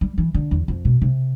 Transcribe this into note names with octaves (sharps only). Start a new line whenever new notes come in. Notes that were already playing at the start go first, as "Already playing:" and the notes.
G3
E3
D3
E2
F2
B2
C3